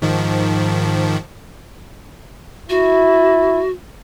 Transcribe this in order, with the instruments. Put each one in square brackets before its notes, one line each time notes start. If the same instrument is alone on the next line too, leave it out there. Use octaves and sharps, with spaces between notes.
[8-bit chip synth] G#2 D#3 F3
[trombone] E4 [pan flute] F#4